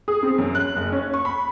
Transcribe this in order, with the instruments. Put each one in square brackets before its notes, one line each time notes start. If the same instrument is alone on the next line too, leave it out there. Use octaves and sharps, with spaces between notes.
[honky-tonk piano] G#4
C4
F#2
F#6
F#1
C#4
C#6
B5